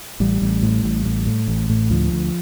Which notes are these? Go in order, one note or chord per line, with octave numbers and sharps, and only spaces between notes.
A1 G3
A1
A2
A1
A2
A2
A1
A2
D2 F3
D2